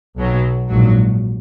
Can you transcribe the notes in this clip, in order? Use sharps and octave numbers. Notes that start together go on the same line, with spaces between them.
B1 B2 F#3
A#1 G#2 F#3